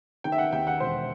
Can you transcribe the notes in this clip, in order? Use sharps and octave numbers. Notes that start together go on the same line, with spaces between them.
D#3 G5
E5
F#5
D#2 G5
F#5
E1 C5